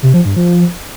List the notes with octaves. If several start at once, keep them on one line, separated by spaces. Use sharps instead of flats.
C3
F3
G2
F3